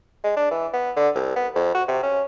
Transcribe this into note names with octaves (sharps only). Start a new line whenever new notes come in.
G#3
D4
E3
B3
D3
C2
B3
F2
F#4
C3
C#4